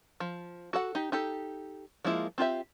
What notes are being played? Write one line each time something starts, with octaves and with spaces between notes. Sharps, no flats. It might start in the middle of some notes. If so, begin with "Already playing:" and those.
F3
F#4 A4 F#5
D#4 G4
D#4 G4 A4
F3 G#3 A#3 E4 F4
C4 F4 G4 E5